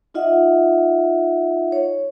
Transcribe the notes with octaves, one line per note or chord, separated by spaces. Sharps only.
D#4 F4 D#5 E5 F#5
C#5